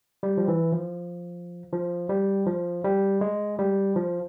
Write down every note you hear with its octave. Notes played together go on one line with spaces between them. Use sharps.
G3
F3
E3
F3
F3
G3
F3
G3
G#3
G3
F3